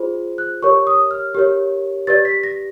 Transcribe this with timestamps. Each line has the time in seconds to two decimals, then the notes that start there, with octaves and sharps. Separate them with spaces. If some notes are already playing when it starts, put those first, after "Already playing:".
Already playing: F4 G#4 C5
0.38 F#6
0.62 G4 A#4 C#5 C#6
0.87 D#6
1.11 F6
1.35 G4 A#4 C#5
2.07 G4 B4 D5 A6
2.25 B6
2.44 A#6